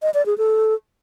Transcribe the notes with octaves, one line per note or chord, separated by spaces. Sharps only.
D#5
D5
G#4
A4